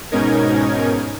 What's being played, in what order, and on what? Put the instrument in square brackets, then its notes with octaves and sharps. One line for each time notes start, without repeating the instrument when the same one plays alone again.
[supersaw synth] G#2 B2 C#4 D#4 A#4 G#6